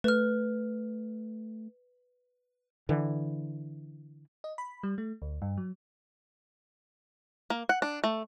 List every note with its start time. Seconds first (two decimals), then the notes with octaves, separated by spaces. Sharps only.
0.04 A3 B4 F6
2.89 D3 E3
4.44 D#5
4.58 B5
4.83 G3
4.98 A3
5.22 D2
5.42 G2
5.57 F#3
7.50 A#3
7.69 F#5
7.82 D4
8.04 A3